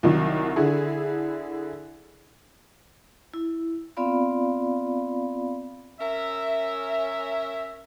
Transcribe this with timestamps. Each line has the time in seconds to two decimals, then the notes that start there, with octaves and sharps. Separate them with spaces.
0.03 C2 D#3 F#3
0.56 D3 E4 G#4
3.34 E4
3.97 B3 C4 F4 D5 F5 B5
6.00 C#4 A#4 E5